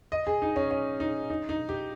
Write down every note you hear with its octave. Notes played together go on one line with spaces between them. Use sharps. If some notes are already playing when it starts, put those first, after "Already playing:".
D#5
G#4
D#4
C#4
C#4
D#4
D#4
D#4
G4